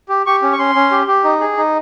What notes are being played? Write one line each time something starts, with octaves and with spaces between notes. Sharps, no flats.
G4
G4 C#6
C#4
C#6
C#4 C6
C#4
G4
G4
D#4
G#4
D#4